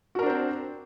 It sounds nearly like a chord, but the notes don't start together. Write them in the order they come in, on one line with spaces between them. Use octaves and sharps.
F#4 A#4 D4 C5 C4